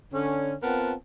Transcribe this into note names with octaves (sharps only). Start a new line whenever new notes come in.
D3 C#4
B3 C4 F4 A#4 F#5 A5